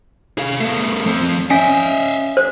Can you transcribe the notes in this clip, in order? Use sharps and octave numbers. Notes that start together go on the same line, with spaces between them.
G#4 F5
A3 B3
F3 C4
C#4 D#5 E5 G#5 B6
C5